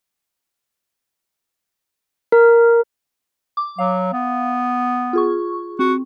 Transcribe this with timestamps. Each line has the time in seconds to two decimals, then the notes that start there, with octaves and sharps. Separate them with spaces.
2.32 A#4
3.57 D6
3.78 F#3 F5
4.13 B3
5.13 F4 G#4 C#6
5.79 C4 F#4